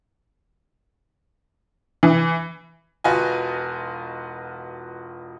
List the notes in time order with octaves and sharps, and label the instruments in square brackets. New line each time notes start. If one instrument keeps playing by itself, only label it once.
[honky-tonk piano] E3
[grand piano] E1 F4 F#4 B4 D#5 G#5